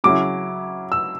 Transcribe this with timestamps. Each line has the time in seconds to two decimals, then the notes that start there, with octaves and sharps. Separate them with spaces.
0.04 C#3 F#3 C#4 E4 D6
0.92 E6